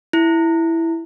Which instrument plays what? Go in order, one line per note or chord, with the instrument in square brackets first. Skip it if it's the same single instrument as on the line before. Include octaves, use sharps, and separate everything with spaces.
[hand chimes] E4